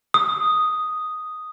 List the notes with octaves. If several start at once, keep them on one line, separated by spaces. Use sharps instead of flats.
D#6